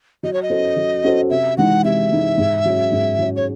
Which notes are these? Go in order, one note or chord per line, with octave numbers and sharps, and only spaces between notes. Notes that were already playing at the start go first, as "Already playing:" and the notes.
F#3 D#5
C#5
D#5
C#4 F#4 A4 C5
F#3
C#4 F#4 A4 C5
C3 E5
E3 G#3 D#4 F#5
C3 E5
E3 G#3 D#4
G#2
F#3 C#4
G#2
F#3 C#4
C#5